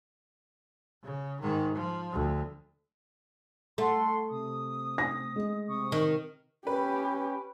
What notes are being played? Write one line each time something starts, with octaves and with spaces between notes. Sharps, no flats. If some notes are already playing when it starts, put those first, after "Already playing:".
C#3
G#2 D#3
F3
D2
A3 A4 F#5 C6
C3 D#6
A#6
G#3
C3 C#6 D#6
D#3
C#4 G4 B4